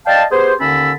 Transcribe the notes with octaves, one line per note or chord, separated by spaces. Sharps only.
D5 D#5 F5 G5 A5
B3 G4 G#4 C5
D#2 D3 C#4 A5 B5 E6